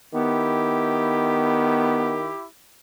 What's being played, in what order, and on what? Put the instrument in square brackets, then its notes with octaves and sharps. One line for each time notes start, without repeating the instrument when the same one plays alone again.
[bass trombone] D#3 [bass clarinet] B3 [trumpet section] E4 G4